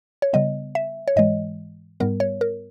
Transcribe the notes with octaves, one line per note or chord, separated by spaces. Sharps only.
C#5
C#3 G3 B3 D#5
E5
C#5
G#2 E3 G#3 D#5
G#2 G3 B3 A#4
C#5
A#4